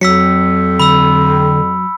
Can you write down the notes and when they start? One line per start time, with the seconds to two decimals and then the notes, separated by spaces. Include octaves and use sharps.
0.01 F2 F#3 E6 B6 C#7
0.79 D3 B5 E6